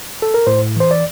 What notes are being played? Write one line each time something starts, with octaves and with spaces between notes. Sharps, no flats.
A4
A#4
A2 C5
E3 C5
D5